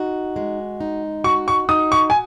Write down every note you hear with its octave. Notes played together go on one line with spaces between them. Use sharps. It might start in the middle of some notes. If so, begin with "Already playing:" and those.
Already playing: D#4 F#4
G#3
D#4
F#4 C#6
C#6
D#4 D#6
C#6
G#5